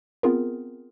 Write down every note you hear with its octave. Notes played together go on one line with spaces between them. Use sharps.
B3 C4 F4 G#4 A#4